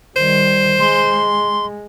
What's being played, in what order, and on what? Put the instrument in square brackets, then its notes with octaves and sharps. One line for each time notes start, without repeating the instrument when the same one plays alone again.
[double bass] D#3 G3 [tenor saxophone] C5
[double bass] G#3 [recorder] C6